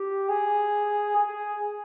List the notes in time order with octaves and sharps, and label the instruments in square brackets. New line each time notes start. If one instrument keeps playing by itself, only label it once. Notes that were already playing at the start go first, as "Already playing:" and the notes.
Already playing: [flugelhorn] G4
G#4
G#4